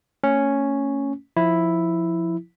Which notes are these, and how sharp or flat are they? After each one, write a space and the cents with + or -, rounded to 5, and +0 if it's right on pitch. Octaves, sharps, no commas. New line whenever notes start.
A3 +40 C#4 +0
F3 +0 E4 +0